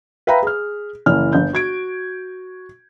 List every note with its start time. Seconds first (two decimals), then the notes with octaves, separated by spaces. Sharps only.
0.27 B4 E5 F5 G5 A#5 B5
0.42 G#4 F6
1.06 F#1 E3 F6
1.33 G1 G6
1.53 F#4 G#6 D7